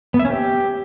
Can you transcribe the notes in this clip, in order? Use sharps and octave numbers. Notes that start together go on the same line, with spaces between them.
B3
E5
C#4
G4